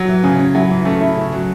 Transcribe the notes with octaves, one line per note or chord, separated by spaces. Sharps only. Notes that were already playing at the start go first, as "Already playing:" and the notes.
Already playing: F#3
E3
C#3 C#4
C#4
F#3 E4
E3
A3 C#4
E4
C#3
F#3